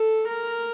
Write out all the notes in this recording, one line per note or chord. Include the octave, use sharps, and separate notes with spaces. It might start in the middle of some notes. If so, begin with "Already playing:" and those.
Already playing: A4
A#4